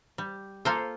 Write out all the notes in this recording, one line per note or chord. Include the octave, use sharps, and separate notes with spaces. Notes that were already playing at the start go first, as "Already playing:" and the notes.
G3
A#3 F4 A4 C5